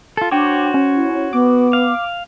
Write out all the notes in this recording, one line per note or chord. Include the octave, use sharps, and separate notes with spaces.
F4 A4
D4 F#4 C5 C#5 G5 D6
C#4
E4
B3 D6
F5